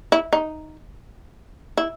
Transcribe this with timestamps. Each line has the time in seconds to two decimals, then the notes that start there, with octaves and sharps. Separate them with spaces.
0.12 E4
0.33 D#4
1.77 E4